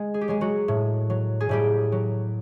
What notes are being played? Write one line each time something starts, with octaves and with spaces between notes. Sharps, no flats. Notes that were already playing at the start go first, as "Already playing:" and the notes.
Already playing: G#3
G#4
G4
F#3 G#3 G#4
F#3 F#4
A2
F#3
G#4
A2 G3 G4
F#3